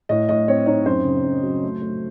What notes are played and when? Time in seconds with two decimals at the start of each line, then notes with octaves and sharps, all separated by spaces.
0.09 A2 D#5
0.29 A2 D#5
0.48 C4 C#5
0.66 D#4 C#5
0.86 F#2 C5
1.05 C#3
1.24 F#2
1.43 F#3
1.63 A3
1.82 A3